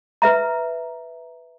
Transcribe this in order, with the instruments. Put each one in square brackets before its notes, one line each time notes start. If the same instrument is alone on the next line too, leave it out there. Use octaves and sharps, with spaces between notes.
[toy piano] B4 E5 A#5